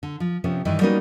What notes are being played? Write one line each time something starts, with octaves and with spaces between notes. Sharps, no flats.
D3
F3
C3 F3 B3 C#4
G2 D#3 E3 E4
G3 A#3 B3 C#4 D#4 F#4